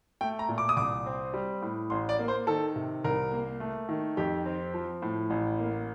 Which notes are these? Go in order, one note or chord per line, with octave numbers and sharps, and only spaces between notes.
A3 G5
A#5
A#2
D6
D#6
C2 D6
C4
G3
A2
A1 C6
D5
A#3
C5
D#3 A4
C3
C2 A#4
A#3
A3
D#3
F2 G4
C4
F3
A2
A1
A#3